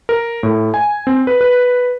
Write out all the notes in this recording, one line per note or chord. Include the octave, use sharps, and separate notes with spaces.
A#4
A2
G#5
C4
B4
B4